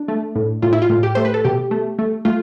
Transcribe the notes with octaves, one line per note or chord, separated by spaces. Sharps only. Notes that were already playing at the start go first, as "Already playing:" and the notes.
Already playing: D4
A3
A2
A2 F4
E4
F4
A2
G4
A3 C5
B4
A4
B2 G4
A3
A3
A3 F4